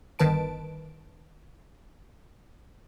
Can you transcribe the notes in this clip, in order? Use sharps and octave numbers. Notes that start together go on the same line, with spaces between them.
G1 D#3 B4 A5 D7